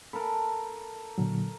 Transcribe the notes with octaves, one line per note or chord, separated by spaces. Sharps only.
A4 A#4 B5
A#2 D3 F#3